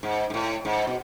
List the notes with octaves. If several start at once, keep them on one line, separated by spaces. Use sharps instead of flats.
G#2
G#2
A2
G#2
B2